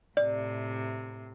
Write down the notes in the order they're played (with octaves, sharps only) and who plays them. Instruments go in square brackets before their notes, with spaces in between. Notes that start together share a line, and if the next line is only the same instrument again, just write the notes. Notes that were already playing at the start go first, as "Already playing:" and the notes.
[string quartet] A2 C3 [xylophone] D5